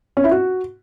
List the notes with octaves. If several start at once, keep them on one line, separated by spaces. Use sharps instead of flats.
C#4
E4
F#4